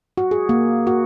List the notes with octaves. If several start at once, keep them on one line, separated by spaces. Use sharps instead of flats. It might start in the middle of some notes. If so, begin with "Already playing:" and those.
F#4
G#4
A#3
F#4